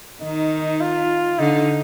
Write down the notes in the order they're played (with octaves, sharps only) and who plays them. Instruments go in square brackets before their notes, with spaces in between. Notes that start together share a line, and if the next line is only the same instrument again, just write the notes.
[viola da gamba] D#3 [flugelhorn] D#4
[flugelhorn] F4
[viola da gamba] D3 [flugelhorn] D#4